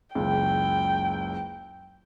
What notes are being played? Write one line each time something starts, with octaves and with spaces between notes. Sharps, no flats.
F#1 C#2 G5